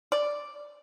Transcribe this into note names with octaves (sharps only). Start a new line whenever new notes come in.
D5